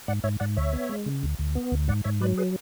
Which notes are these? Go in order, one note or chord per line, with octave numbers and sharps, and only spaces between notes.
G#2 D5 F#5
G#2 C#5 E5
G#2 D5 F#5
D2 C#5 E5
B3
G#3
C#3
D2
D2
B3
D2
G#2 D5 F#5
G#2 C#5 E5
F#3 B4 D5
G#4 B4